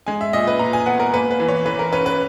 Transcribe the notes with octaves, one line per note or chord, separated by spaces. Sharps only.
G#3 G#5
E5
A#2 D#5
B4
A#2 A#5
G#5
B3 F#5
A#4
A#3 B4
B4
E3
C#5
E3 B4
A#4
C#4 B4
B4